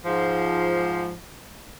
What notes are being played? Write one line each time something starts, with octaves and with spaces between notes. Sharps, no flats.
G#2 F3